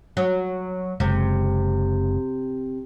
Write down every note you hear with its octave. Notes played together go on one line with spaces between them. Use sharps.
F#3
F#1 C3 G#3